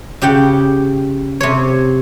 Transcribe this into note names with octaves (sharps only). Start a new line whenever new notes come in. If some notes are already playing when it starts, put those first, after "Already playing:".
C#3 G4 F#5 G5
C3 C#5